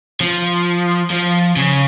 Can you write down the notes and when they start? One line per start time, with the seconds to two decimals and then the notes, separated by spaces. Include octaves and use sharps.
0.21 F3
1.11 F3
1.56 C#3